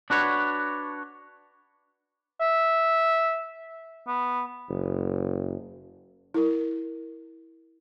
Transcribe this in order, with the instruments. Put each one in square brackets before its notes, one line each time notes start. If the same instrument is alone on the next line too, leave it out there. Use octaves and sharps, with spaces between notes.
[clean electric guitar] D4 F#4 B4 C#5
[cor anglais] E5
B3
[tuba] F#1
[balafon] E4 A#4